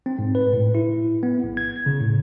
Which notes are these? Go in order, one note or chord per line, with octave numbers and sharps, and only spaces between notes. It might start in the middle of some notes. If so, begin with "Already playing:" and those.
C4
G#2
B4
A2
E4
B3
A#1
G#6
C#3
A2